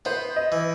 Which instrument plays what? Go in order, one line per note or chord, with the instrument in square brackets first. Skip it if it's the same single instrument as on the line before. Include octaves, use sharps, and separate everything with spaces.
[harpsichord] B3 [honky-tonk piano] C5
[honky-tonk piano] D#5
[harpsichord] E3